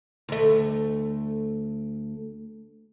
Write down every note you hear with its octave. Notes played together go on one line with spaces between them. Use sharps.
D2 A3